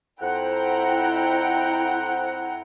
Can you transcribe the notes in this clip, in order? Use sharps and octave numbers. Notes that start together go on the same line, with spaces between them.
F2 E4 C5 F#5 G5 A#5